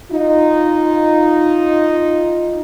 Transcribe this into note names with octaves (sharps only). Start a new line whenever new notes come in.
D#4 F4